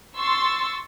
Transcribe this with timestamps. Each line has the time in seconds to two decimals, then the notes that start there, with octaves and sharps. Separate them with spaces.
0.16 C6 C#6 E6 A6